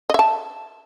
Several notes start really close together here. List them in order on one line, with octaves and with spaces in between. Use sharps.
D#5 E5 A5